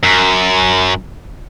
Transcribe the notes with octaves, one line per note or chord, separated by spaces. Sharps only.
F#2